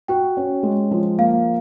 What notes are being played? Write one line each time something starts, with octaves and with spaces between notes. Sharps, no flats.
F#4 G5
C#4
G#3
F3
A#3 F5